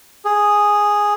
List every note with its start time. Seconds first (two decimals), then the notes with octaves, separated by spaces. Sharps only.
0.25 G#4